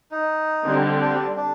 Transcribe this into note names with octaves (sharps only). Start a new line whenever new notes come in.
D#4
D3 G3 C4
D4
D4